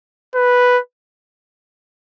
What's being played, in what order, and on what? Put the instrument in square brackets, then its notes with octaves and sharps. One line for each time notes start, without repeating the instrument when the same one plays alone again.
[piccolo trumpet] B4